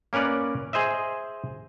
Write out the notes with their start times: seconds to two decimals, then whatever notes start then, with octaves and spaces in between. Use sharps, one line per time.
0.13 A#3 C#4 A#4 B4 D5
0.73 G#4 C5 D#5 E5